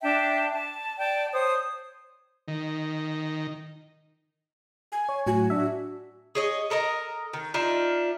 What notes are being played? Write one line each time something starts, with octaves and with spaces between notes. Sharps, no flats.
D4 E5 G5 A5
A5
D5 G5 A5
C5 C#5 D#6
D#3
G#5
C#5
A2 F#3 F#4 G#5
D4 E5
G#4 C#5 D#5
A4 A#4 D#5 A#5
D#3
D4 D#4 F4 E5